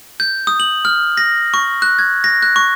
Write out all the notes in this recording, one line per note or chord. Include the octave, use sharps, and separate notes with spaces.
G6
D#6
F#7
F6
A#6
C#6
F#6
G#6
A#6
F#6
C#6